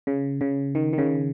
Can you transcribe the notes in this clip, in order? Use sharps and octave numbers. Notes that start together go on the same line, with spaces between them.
C#3
C#3
D#3
D#3
C#3